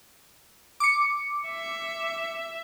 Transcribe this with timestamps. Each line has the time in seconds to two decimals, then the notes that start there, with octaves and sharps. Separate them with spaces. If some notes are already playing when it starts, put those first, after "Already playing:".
0.80 D6 C#7
1.49 E5